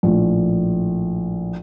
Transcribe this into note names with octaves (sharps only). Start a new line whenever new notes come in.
A#1 A2